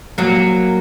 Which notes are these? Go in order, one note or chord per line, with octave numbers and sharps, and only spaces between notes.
F#3 A#3